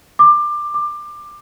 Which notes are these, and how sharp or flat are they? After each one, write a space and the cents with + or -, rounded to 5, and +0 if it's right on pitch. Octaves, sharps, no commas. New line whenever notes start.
D6 +20
D6 +20